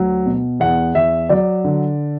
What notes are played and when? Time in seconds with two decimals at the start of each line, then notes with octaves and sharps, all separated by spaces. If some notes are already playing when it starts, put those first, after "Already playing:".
Already playing: D2 F#3
0.26 B2
0.60 E2 F#5
0.95 E2 E5
1.29 F#3 D5
1.64 D3